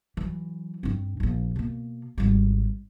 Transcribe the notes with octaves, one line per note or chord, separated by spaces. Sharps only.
E3 F#3
G2 C4
D1 A#1
B2 A#3
G#1 G3